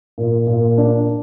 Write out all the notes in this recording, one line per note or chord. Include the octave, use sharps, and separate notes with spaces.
A#2
A#2
D4